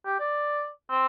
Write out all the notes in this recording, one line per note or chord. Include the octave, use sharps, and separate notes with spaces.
G4
D5
C4